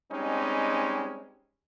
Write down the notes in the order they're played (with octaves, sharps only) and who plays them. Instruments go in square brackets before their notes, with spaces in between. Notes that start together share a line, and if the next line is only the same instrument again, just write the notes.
[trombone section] G3 G#3 C4 C#4 D#4